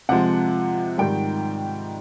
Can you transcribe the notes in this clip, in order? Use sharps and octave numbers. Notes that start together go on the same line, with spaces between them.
C3 F3 G#3 F#5
G#2 D#3 G3 G5